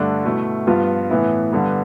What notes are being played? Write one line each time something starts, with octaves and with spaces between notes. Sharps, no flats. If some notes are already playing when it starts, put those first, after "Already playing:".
Already playing: G2 D3 A3 D4
B2 A3 E4
G2 F3 B3 F4
A2 E3 B3 E4
G2 D3 G3 B3